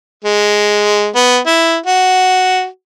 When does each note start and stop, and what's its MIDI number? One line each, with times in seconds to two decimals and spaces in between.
0.25 1.08 56
1.16 1.38 59
1.47 1.77 64
1.86 2.66 66